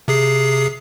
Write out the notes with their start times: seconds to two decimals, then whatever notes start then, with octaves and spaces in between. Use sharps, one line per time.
0.08 C3 G#4 C7